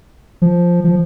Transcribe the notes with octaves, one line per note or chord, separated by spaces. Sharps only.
F3
F3